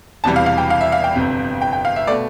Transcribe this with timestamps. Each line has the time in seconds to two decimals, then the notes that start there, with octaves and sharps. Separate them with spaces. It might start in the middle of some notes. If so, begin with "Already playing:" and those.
0.24 E1 E2 C3 E3 G3 A5
0.36 F5
0.46 F5
0.58 G5
0.70 F5
0.81 E5
0.92 F5
1.04 G5
1.15 G1 F2 C3
1.62 G5
1.73 G5
1.85 F5
1.96 E5
2.07 B2 A3 D5